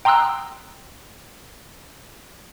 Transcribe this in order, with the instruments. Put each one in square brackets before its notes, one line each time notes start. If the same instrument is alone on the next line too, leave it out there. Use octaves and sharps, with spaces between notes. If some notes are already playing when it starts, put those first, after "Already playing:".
[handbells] G5 A#5 C6 D#6 E6 F#6